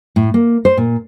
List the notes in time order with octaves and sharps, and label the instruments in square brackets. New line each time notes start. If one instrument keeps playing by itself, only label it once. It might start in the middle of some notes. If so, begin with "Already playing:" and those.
[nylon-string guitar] A2
A#3
C5
A#2